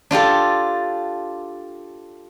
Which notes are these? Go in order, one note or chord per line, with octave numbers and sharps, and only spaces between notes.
D4 F4 G4 A4